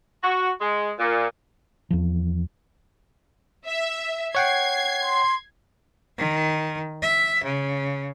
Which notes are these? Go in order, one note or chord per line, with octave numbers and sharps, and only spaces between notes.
F#4
G#3
A#2
E2 F3
E5
C#5 F#5 G5 G#6 C7
C6
D#3
E5
C#3